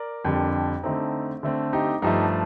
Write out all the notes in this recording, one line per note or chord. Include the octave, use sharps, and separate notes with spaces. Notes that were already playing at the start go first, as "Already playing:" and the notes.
Already playing: A#4 D5
F2 D3 G3
D3 A3 C4 D#4
D3 A3 C4
D#4 G4
G2 F3 A3 D#4 G4